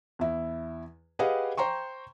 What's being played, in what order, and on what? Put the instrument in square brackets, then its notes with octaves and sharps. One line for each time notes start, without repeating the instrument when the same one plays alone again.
[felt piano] E2 E4
G4 G#4 B4 D#5 F5 F#5
C5 G5 A#5 C6 C#6